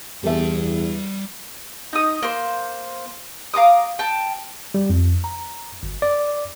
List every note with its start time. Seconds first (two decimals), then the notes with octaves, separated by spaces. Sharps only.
0.24 E2 G3 G4 A4 E5 A5
1.93 D#4 D#6
2.22 A#3 C5
3.54 F5 A#5 D6 D#6
3.99 G5 A5
4.74 G3
4.90 F2
5.24 A#5
5.83 G1
6.02 D5